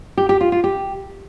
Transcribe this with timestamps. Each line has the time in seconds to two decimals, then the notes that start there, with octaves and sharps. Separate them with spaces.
0.18 G4
0.29 G4
0.41 F4
0.52 F4
0.64 G4